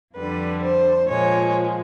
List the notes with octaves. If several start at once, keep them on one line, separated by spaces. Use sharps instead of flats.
F2 D3 G3 B4
C5
A#2 F3 G#3 C#5